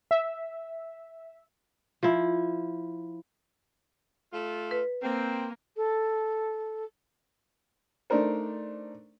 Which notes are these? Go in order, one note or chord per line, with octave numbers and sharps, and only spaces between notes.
E5
F3 E4
A3 F4
B4
A#3 C4
A4
A3 D4 D#4 A#4 C5